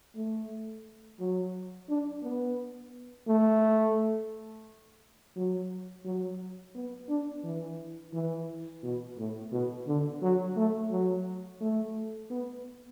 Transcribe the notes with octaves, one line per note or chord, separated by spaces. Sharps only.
A3
F#3
D4
B3
A3
F#3
F#3
B3
D4
E3
E3
B2
A2
B2
D3
F#3
A3
F#3
A3
B3